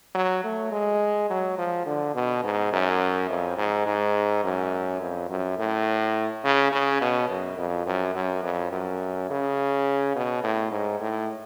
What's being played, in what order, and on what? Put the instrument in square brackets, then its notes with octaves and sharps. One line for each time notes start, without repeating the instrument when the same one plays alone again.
[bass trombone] F#3
A3
G#3
F#3
F3
D3
B2
G#2
F#2
F2
G#2
G#2
F#2
F2
F#2
A2
C#3
C#3
B2
F#2
F2
F#2
F#2
F2
F#2
C#3
B2
A2
G#2
A2